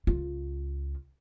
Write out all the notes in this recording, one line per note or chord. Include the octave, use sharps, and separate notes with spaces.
C#2 F4